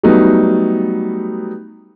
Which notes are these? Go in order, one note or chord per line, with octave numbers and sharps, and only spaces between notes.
F#3 G3 A3 B3 D#4